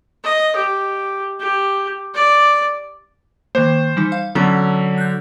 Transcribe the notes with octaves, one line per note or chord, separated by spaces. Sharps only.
D#5
G4
G4
D5
D#3 A#3 C5
E3 G3 D#4
F5
D3 F#3 B3 C#4 A#5
F#6 G6